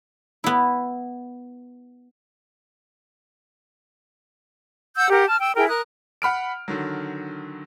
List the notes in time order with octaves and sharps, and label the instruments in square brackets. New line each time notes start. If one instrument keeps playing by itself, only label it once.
[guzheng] B3 E4
[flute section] F#5 E6 G6
G4 A#4 F#5
A5 F6
G5 E6
E4 G#4 A#4 G5
A#4 D#6 F#6
[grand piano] F#5 B5 F6 D7
D3 D#3 F#3